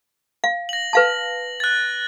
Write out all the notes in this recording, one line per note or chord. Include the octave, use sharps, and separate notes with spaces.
F5
A#6 F#7
B4 F5 A5
F#6 A6